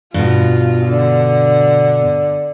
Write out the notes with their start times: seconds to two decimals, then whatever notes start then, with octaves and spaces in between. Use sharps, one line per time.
0.14 G2 B2 F4
0.88 D3